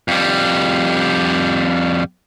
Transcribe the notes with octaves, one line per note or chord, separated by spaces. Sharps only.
F2 G3